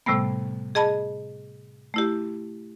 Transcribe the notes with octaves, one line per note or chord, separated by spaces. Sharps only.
A2 C3 G3 A3 B3
G#4 D#5 A5 B5
A3 E4 G4